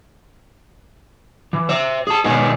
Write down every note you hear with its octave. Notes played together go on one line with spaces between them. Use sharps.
E3
C5 E5
G#4 A5
B2 D#3 G#3 B3 G#4